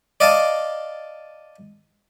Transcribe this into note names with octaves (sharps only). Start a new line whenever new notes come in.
D5 D#5 F5 A5